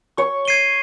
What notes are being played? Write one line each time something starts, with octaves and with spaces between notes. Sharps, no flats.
C#5 C#6
G#6 C7 D#7 G7